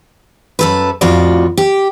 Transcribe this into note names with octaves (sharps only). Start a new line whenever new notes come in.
F#2 A4 B4
F2 A2 F4 F#4 D5
G4